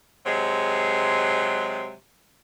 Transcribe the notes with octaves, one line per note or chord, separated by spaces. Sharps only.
C3 F#3 G#3